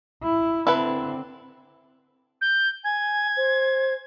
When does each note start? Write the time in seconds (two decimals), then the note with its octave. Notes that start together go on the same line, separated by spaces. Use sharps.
0.23 E4
0.67 D3 C4 E4 A4 B4
2.41 G6
2.84 G#5 G#6
3.37 C5